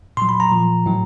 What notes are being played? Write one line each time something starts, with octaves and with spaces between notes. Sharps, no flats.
A#2 F#3 C6
B5
A#5
A#2 F3
A2 F#3